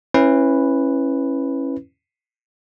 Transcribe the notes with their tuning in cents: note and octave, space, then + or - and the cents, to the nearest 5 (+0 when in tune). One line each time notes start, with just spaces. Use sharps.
C#4 -25 E4 +0 B4 +0